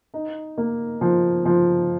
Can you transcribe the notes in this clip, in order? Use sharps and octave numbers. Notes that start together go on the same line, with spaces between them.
D#4
A#3
F3
F3